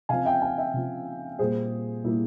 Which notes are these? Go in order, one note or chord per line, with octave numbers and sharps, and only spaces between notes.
C#3 F3 C4 F5 G#5
E5 G5
F5 G#5
E5 G5
C#3 F3 C4
A#2 G3 A#3 G#4 C5
A#2 G3 A#3 E4